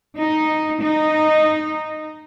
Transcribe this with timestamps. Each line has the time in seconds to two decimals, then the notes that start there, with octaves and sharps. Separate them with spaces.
0.18 D#4
0.83 D#4